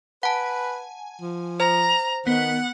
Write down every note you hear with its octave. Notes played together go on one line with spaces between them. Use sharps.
B4 F#5 G#5 A5
F3
C5 A#5
D#3 B3 F#5